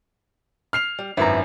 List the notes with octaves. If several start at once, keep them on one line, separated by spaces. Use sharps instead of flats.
F6 C7 F7
G3
G#1 F#2 E4 B4 A#5